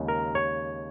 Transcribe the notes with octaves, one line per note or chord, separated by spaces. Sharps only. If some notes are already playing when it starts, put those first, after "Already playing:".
Already playing: D#2 C#3 G#3
A#4
C#5